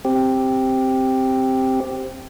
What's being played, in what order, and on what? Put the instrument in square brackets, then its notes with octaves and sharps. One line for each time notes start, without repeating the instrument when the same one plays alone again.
[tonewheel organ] C4 G4